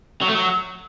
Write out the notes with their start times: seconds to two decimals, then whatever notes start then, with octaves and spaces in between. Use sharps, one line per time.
0.22 F#3
0.28 A3
0.34 F#3